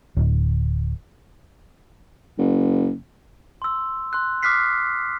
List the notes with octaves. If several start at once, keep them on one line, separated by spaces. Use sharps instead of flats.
D1
F#1
C6 E6
C6 F#6
D6 D#6 F6 F#6 B6 C7